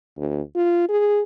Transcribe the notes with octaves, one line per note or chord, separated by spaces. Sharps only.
D2
F4
G#4